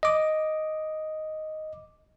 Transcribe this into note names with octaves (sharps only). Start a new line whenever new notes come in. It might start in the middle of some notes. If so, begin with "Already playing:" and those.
D#5 D6